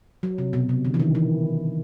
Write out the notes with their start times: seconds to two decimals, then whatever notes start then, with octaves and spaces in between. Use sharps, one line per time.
0.23 F#3
0.38 C3
0.53 B2
0.69 C3
0.85 D3
0.94 E3
1.00 D#3
1.15 E3